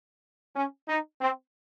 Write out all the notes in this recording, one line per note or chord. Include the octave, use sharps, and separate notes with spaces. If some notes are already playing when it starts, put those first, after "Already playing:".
C#4
D#4
C4